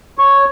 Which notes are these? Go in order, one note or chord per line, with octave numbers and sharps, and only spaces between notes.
C#5